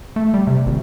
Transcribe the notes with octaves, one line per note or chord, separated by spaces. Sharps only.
A3
G3
C3
G#1